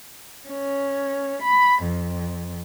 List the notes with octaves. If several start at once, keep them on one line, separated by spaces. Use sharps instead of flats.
C#4
B5
F2